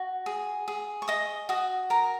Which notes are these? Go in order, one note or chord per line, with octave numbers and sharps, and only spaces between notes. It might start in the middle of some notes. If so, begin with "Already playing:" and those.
Already playing: F#4
G#4
G#4
C#6
D#5 D#6
F#4 D#6
A#4 A#5